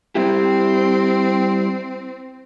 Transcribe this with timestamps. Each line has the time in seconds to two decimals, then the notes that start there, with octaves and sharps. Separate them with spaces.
0.15 G3 C4 E4 G4